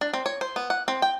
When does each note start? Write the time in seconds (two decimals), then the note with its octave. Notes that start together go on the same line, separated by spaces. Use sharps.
0.01 D4
0.13 C4
0.26 C#5
0.41 C5
0.56 B3
0.70 F#5
0.88 C4
1.02 G5